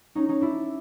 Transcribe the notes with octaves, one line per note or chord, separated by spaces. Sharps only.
C#4 D#4
C#4 D#4
D4 E4